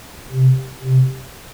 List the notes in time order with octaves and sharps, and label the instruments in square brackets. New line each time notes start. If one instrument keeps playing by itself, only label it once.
[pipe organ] C3
C3